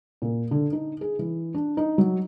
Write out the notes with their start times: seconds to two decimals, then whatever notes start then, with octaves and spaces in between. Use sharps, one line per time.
0.22 A#2
0.51 D3
0.72 D#4
1.01 G#4
1.19 E3
1.54 D4
1.77 D#4
1.98 F#3